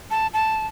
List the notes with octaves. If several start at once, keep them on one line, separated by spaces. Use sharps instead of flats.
A5
A5